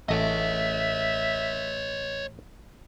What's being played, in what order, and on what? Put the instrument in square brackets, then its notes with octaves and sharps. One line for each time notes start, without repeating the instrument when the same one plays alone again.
[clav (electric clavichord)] A1 A3 [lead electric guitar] C#5 D#5 [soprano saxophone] E5